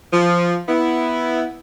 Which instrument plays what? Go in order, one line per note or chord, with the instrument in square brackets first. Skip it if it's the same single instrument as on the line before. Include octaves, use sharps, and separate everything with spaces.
[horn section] F3
B3 E4